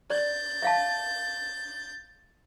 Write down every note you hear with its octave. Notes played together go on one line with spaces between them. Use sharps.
D5 G6 A6
E5 F5 A5